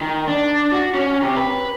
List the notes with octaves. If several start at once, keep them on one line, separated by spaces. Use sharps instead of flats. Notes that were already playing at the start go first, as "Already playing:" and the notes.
D#3
D4
F#4
C#4
C3
B4